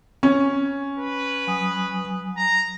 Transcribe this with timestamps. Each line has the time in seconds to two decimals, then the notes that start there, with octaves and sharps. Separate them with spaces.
0.23 C#4
0.98 B4
1.47 F#3 G#5 D#6
2.37 A#5